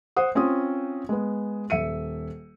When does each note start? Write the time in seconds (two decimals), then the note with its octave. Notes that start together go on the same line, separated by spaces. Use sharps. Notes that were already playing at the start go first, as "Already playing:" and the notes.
0.16 C5 F#5 D#6
0.35 C4 C#4 F4 D#6
1.09 G#3 B3
1.70 D#1 E5 C#7 D#7